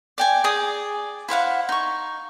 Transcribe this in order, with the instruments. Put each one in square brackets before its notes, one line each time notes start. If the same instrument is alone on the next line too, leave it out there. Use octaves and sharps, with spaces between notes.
[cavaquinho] D5 G5 G#5
G#4 D5 D#6
E4 C5 F5 F#5
D#4 C#6